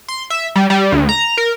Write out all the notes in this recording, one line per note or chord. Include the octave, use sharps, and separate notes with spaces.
C6
E5
G3
G3
D2
A#5
A#4